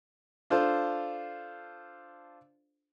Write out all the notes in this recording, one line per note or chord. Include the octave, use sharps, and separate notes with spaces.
D4 F4 A4 C5